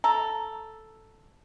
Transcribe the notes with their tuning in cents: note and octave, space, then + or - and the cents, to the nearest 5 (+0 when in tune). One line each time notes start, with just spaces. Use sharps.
A4 +0 A#5 +0